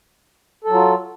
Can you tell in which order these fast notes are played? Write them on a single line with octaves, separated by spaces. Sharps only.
A4 F#3 F4